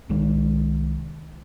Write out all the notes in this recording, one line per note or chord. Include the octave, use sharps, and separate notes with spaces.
C2 D#3 G#3